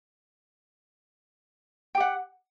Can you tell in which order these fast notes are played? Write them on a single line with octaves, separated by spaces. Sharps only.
G5 G4 F#5